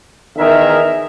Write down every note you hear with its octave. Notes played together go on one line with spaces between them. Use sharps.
E2 D#3 G#4 A#4 E5